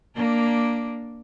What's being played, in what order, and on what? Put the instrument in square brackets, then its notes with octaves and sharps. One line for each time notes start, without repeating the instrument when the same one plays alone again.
[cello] A#3 D4